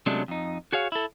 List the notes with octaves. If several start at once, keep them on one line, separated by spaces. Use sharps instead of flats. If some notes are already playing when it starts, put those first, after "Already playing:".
C3 F#3 G#3 A3 C#4 D4
F2 D#4
F#4 G#4 C#5 F5
E4 A4